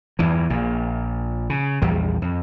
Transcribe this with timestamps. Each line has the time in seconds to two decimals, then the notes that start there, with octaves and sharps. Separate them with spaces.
0.19 E2 G2 E3
0.50 A#1 A#2
1.50 C#3
1.82 A#1 E2 G3
2.22 F2